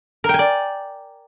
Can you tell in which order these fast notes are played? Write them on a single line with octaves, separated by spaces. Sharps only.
A#4 G5 G#5 D5